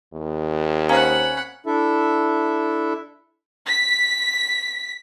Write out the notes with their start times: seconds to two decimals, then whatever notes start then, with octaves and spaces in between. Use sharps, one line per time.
0.13 D#2
0.89 C#4 C5 F5 F#5 A#5 B5
1.66 D4 E4 A4 E5
3.67 B6